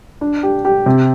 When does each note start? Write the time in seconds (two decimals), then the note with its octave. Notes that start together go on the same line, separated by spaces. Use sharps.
0.21 D4
0.43 G4
0.65 G4
0.86 C3